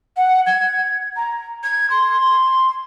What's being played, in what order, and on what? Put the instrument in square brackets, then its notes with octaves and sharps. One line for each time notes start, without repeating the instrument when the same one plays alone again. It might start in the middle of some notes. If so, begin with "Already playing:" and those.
[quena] F#5
G#6
A#5
G#6
C6